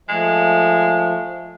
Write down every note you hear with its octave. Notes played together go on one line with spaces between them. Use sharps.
F3 G#3 A3